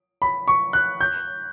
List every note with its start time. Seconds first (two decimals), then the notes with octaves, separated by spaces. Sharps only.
0.22 B5
0.48 C#6
0.73 F#6
1.01 G6